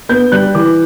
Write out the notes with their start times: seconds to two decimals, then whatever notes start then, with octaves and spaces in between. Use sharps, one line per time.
0.09 B3 G6
0.32 G3 F#6
0.55 E3 D6